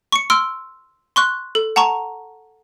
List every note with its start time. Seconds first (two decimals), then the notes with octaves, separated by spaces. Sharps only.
0.12 C#6 C#7
0.30 C6 E6 F6 D7
1.16 C6 C#6 F#6
1.55 A4
1.76 F#5 A5 A#5 C#6